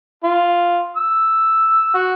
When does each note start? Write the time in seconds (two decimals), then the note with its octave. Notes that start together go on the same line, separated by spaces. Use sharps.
0.24 F4
0.97 E6
1.94 F#4